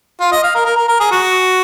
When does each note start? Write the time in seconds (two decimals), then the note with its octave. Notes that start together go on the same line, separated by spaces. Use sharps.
0.20 F4
0.32 D#5
0.43 F5
0.55 A#4
0.65 A#4
0.77 A#4
0.88 A#4
1.00 G#4
1.11 F#4